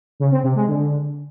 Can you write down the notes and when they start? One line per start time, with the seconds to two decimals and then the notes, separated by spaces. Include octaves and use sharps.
0.20 C#3
0.32 C4
0.44 C3
0.56 G#3
0.67 D3